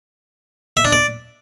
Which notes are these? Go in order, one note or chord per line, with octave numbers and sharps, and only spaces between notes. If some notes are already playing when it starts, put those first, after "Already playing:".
E5
D4
D5